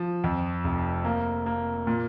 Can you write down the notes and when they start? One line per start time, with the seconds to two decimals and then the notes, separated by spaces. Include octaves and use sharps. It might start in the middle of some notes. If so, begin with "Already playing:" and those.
Already playing: F3
0.24 F2
0.64 F1
1.05 A#3
1.46 A#3
1.87 A#2